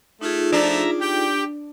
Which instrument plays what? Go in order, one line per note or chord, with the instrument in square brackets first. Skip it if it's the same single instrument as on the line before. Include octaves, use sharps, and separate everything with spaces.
[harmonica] A3 [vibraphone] D#4 F4 G#4
[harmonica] F3 A3 [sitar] D4 [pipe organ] E5 A#5
[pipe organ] G4 [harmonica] G5